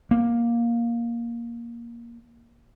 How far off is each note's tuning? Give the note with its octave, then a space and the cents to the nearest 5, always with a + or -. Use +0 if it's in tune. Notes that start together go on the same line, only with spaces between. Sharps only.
A#3 +10